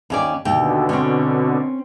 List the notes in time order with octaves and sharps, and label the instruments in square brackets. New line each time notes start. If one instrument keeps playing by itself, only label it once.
[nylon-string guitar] D#2 C#4 D5
[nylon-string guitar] D#2 G5 [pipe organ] B2 D3
[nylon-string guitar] C4 C#4